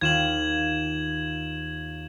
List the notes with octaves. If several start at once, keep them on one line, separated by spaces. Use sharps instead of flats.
D#2 F4 G#6 E7 F#7